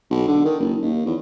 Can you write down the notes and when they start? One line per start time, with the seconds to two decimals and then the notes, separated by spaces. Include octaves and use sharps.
0.10 B1
0.28 D3
0.45 D#3
0.60 F#1
0.82 D#2
1.06 E2